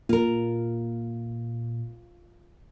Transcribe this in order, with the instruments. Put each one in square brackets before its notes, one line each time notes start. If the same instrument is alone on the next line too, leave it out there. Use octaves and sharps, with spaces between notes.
[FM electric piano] A#2 [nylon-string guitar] F4 A#4